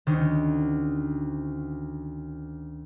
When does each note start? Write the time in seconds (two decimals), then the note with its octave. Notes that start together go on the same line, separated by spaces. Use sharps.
0.07 D2 D#3 C#4